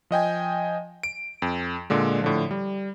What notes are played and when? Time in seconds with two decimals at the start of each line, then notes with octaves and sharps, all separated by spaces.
0.11 F3 D#5 G5 G#5
1.03 D7
1.42 F2
1.90 A#2 D3 G#3
2.22 A2 D3 F3
2.51 G3